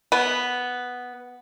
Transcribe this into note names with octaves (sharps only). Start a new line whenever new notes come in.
B3